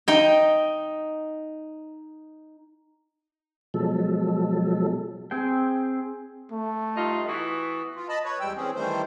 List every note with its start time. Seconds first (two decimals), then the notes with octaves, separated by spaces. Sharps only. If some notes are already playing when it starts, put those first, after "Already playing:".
0.08 D#4 D#5 G5
3.74 B2 F3 F#3 G#3 A4
5.31 C4 G#4 G5
6.52 A3
6.96 G2 D#4 F4
7.27 E3 B3 F#4
7.96 F4
8.09 D#5 A5 B5
8.25 B4 C#5
8.40 E2 G3 G#3 G5 E6
8.57 E3 C4 C#4 G#4
8.75 D#3 E3 G3 A3 C5